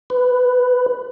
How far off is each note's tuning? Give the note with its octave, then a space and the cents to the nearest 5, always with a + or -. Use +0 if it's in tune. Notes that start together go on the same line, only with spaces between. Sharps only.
B4 +15